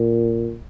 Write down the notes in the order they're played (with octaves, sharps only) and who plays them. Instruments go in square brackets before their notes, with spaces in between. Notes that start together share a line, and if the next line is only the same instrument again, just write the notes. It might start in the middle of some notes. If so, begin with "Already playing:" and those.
Already playing: [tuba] A#2